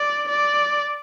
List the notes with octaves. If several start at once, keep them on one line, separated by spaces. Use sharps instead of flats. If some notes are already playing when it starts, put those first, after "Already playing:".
Already playing: D5
D5